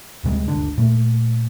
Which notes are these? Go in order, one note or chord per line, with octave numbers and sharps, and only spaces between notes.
D2 C3 G3 G#3
G1 D2 D3 D4
A#2 A3